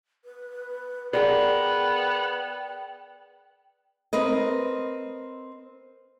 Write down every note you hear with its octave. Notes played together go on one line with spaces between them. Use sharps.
B4
B3 G#4 A#4 D5 F#5 G5
C4 A#4 B4 D#5